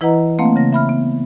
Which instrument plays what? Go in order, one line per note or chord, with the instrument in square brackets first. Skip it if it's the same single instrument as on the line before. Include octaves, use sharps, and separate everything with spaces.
[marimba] E3 E4 B4 D#5 F#5 A#5
A3 A#3 C4 F5 F#5
C#3 A#6
E5 B5 F6
B3